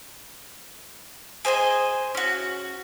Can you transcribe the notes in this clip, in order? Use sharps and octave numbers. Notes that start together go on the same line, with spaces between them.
G#4 C5 D#5 G#5
C#4 F#4